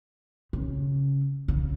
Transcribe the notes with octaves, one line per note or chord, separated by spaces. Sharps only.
C#3
C#3